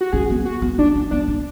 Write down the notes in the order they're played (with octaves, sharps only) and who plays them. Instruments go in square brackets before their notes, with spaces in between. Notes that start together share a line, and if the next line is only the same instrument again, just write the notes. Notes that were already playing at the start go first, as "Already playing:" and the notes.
[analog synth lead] F#4
[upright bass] C#4 [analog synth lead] G#4
[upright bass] B3
[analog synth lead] F#4
[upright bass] B3
[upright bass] B3 [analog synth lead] D4
[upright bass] C#4
[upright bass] B3 [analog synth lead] D4
[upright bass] D4